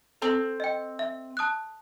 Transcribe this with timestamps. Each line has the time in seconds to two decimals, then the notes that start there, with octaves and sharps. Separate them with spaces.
0.22 C4 A4
0.60 D#5 G5
0.99 E5
1.37 A5 D#6 F#6